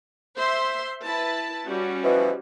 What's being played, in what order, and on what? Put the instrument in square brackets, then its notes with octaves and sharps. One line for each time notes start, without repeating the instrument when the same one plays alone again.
[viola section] C5 E5 C6
E4 B4 A5
G3 C#4 F#4
[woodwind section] B2 E3 F3